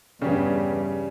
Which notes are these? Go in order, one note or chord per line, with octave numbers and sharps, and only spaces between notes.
E2 G2 C#3 G3 C#4